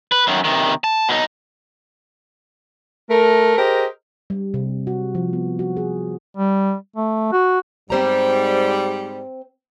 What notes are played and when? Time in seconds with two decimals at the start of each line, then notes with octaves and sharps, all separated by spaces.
0.12 B4
0.27 F#2 D#3
0.45 C3 D#3
0.84 A5
1.09 B2 D#4
3.10 A3 A#4
3.57 G4 G#4 A#4 C5 D#5
4.30 G3
4.54 C3
4.87 F#4
5.15 F3
5.33 B3
5.59 F#4
5.77 G#4
6.37 G3
6.96 A3
7.32 F#4
7.90 G#2 G3 C4 C5 A#5